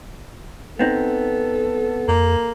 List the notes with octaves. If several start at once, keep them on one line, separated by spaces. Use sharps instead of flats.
B3 C4 D#4 A4
F2 A#3